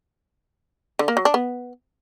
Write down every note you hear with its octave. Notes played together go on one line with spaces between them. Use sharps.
D3
A#3
F#3
D4
B3